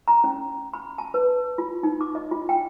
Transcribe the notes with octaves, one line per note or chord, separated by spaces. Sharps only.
A#5
C#4
B5
A5
B4
F4
D#4
D6
D#5
F4
G5